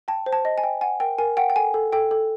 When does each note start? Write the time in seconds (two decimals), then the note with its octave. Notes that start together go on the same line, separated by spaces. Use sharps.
0.08 G5 A5
0.26 C5
0.33 A5
0.45 D#5
0.58 G#5
0.64 G5
0.81 F#5 G#5
1.00 A#4 G5
1.19 A#4 G#5
1.37 F#5 G5
1.50 G5
1.56 A4 G#5
1.74 A4
1.93 A4 G5
2.11 A4